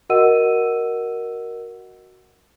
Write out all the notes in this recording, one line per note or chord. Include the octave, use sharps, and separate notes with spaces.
F#4 A#4 D#5 F#5 E6 D#7